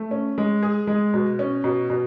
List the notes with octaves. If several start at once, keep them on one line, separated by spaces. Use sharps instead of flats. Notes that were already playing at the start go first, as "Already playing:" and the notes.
Already playing: A3
C#4
G#3
G#4
G#3
B2
C#4
B2
B2